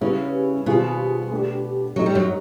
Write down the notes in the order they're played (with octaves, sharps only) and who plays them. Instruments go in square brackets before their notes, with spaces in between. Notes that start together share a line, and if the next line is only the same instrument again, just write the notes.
[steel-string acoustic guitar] C#3 C#4 [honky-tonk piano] G3 B3 E4 G#4 B4
[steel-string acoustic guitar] B2 B3 [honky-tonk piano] D#3 G3 C4 F4 G#4
[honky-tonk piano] A3 D4 G4
[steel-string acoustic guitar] F#3 [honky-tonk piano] A3 C4 D#4 G4
[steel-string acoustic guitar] G3
F#2 F#3